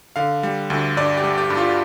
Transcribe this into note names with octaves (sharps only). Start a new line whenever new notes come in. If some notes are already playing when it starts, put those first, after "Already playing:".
D3 F5
G3
D2
G2 D5
G4
G3
G4
G2
F4